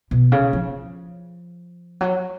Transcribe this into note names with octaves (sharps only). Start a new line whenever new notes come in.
B2
C#3
F3
F#3